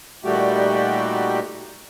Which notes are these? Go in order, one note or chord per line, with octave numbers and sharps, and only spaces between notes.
A#2 D#3 G3 A3 F#4 G4